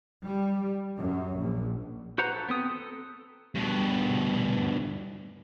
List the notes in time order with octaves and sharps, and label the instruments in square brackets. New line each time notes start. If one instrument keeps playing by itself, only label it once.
[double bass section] G3
F#2
A#1
[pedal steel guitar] F#4 B4 C5 F#5 A#5
A4
B3 C4 D#6
A4
[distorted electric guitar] G2 B2